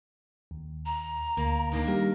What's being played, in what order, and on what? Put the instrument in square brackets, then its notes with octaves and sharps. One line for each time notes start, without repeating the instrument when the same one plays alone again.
[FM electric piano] D#2
[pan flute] A#5
[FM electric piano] D2 [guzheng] A#3
[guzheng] D#3 A#3 D4
[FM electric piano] G3 G4 [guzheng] A#4